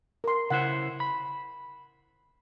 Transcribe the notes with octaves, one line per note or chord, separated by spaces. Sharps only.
A#4 C6
C#3 E4 C5 F#5
B5